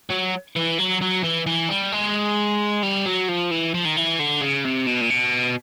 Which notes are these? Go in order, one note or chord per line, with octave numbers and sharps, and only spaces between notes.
F#3
E3
F#3
F#3
E3
E3
G3
G#3
G3
F#3
F3
E3
F3
D#3
E3
D3
C#3
C3
B2
A#2
B2